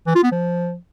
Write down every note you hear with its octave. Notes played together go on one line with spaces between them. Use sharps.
E3
F4
B3
F3